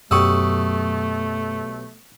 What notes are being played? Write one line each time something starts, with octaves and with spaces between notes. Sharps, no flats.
B1 F#2 A3 G4 F#5 C#6 D#6 E6